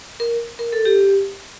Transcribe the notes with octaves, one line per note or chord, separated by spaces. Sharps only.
A#4
A#4
A4
G4